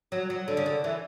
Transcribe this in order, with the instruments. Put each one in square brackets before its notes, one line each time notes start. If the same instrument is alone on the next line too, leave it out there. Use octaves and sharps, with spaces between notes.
[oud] F#3
F#3
D3
C#3
D3
E3